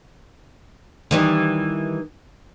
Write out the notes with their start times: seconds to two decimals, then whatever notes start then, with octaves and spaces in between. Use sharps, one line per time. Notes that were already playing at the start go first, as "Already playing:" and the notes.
1.11 D#3 E3 G3